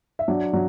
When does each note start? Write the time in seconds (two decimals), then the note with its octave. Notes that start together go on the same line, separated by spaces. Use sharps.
0.19 E5
0.28 F#3 D4 D5
0.53 F#3